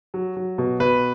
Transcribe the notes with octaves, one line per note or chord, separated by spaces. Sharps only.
F#3
F#3
B2
B2 B4